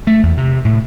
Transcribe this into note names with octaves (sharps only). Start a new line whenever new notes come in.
A3
E2
C3
A2